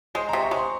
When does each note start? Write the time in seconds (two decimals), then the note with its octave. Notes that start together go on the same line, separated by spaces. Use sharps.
0.15 G#3 C5
0.29 C3 A#5
0.42 C#6
0.51 G#3 C6